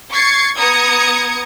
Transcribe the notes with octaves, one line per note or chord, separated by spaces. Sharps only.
C#6 G#6 A6 C7 C#7
B3 A#5 D#6 G#6 C#7